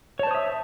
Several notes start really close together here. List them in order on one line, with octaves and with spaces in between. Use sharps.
C#5 A5 C5 D#6 E5